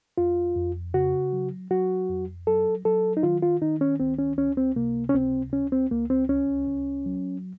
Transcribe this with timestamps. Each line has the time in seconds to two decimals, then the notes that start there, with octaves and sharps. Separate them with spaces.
0.18 F2 F4
0.56 F2
0.94 C#3 F#4
1.33 F#3
1.71 F#3 F#4
2.09 F2
2.47 F#3 A4
2.85 F#3 A4
3.17 D#4
3.23 D#3 F4
3.42 F4
3.62 D#3 D#4
3.81 C#4
4.00 C#2 C4
4.19 C#4
4.38 C#2 C#4
4.57 C4
4.76 C3 A#3
5.09 C#4
5.14 C#2 C4
5.53 C#2 C#4
5.72 C4
5.91 C#2 A#3
6.10 C4
6.29 C2 C#4
6.67 C2
7.06 F#3